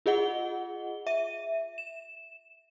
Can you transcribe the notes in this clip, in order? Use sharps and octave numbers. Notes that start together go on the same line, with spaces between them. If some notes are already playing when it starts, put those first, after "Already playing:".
F4 G#4 D#5 F#5 G7
E5 D#7
E7